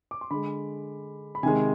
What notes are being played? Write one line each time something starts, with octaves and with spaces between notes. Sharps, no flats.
D6
C6
D3 G#3 B5
B5
C3 D#3 G#3 G#5